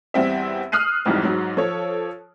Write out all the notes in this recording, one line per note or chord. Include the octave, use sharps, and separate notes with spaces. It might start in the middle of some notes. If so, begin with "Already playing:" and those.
E2 G3 C4 E5
D#6 F6 F#6 C7 D#7
B1 F2 G#2 E3 G3
G#2 F#3
F3 A4 C#5